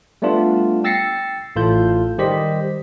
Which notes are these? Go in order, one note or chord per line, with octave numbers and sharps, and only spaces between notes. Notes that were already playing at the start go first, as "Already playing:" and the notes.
G3 A3 B3 D4 F4
G5 E6 A6 A#6 C7 C#7
A1 A2 F4 A4 G6
D#3 G3 G4 C5 D#5 B6